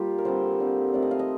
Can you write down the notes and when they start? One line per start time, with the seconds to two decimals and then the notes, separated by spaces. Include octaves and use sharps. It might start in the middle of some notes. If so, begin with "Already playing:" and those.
Already playing: G3 A#3 F4 G4
0.18 A#4
0.25 D3 G3 C4 C5
0.60 D3 G3 C4
0.94 D#3 A3 C4 D5
1.02 D#5
1.11 F5
1.19 D#5